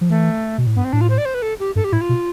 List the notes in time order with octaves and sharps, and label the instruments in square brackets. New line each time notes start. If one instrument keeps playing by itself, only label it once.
[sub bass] F3
[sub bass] E3 [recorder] A3
[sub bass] B2
A2
[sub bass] G2 [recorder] B3
[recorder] C4
[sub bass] A2 [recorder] D4
[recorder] F4
C5
D5
C5
B4
A4
G4
[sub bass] G2 [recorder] A4
[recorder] G4
[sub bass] A2 [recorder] E4
[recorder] F4
[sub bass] B2